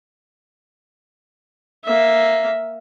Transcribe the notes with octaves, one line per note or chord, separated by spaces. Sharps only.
A#3 E5